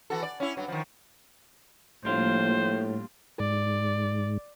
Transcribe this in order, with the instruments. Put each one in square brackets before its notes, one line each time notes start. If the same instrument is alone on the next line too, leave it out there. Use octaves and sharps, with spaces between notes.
[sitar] E3 F#4 A4
D5
C#4 E4
G2 F#3
D#3 F3
[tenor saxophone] A2 [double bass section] F3 A#3 [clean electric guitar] G3 D4 F4 [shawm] C5
[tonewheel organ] G#2 [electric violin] D5